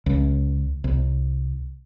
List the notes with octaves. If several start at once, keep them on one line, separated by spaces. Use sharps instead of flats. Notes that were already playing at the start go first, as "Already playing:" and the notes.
C#2
C2